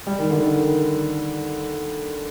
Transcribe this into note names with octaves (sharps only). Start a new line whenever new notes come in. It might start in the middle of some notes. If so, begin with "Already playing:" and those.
G3
D#3
D3
D#3
D#3